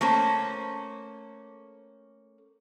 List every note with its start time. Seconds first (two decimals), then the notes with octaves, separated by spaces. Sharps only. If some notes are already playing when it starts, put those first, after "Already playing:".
0.01 A3 A#3 C#4 C5